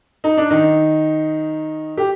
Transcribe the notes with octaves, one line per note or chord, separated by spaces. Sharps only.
D#4
D4
D#3 D#4
G4